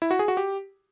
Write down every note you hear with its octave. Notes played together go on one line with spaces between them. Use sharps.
E4
F#4
G#4
F#4
G4